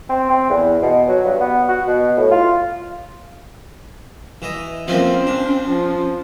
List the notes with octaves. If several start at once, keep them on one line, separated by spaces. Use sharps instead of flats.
C4
C4
E2
B2
F#3
G2
B3
F#4
B2
A2
F4
E3 D#5
F3 A#3 C4 C#4
D4
F3